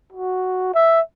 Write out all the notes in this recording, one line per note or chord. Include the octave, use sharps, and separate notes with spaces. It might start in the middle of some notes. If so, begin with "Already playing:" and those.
F#4
E5